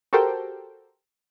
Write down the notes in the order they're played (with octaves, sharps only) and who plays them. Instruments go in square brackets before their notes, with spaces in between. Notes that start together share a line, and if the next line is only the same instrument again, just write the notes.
[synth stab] F#4 G4 A4 A#4 C5 G5